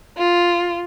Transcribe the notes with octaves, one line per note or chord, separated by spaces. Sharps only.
F4